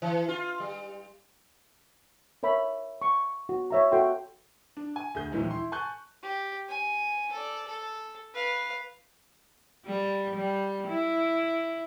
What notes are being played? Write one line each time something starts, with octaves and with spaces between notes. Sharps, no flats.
E3
F4
G3
A#4 C#5 E5 B5
C#6
F#4
C#5 E5 A#5
F#4 A4 E5 G5 C6
D4
G#5
D2 G#4 G6
A#1 D#2 D#3 E3 F#3 G#3
E4 C6
G#5 A5 C#6 F#6 G6
G4
G#5
A4 D5
A4
B4 F5
G3
G3
E4